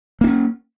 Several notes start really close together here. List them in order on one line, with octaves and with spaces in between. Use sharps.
A#3 D4 C#4